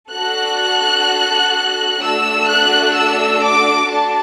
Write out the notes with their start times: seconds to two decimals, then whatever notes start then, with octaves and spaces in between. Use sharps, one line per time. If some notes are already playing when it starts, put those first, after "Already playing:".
0.12 D4 F#4 A4 F#6
2.00 A3 D4 F#4 A4 E6
2.48 F#6
2.95 E6
3.42 D6
3.89 D4 F#4 A4 A5